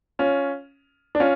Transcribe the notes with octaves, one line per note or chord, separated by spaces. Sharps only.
C#4 F4
D4
C#4 F4